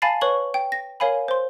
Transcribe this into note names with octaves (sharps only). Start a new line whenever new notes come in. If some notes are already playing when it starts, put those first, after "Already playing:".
F5 G#5 A5 B5 A6 C7
B4 C#5 C#6 F#7
G5
A#6
A#4 C#5 F5 G#5 B5
C5 C6